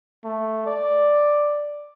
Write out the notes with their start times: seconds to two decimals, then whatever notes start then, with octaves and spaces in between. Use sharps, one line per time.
0.25 A3
0.66 D5